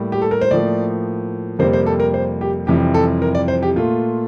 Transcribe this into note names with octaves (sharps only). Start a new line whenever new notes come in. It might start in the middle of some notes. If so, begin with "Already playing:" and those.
Already playing: A2 G3 A#3
G4
A4
A#4
C5
A2 F3 A#3 D5
F2 C3 G3 A#3 C5
C5
A4
A#4
C5
G4
F2 C3 E3 G3 G4
A4
A#4
D5
C5
G4
A#2 A3 F4